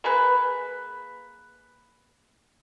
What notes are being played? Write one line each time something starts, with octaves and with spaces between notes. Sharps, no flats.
A#3 G#4 B4